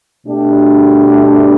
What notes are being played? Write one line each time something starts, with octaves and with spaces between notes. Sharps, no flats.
B2 A3 D4 G4